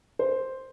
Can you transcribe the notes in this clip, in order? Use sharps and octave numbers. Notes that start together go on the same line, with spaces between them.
C5